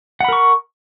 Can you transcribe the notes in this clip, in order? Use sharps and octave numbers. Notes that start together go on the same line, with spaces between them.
A#4 F#5 B5 C#6